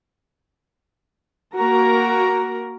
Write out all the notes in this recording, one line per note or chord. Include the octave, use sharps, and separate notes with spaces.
A#3 F#4 A#4 A#5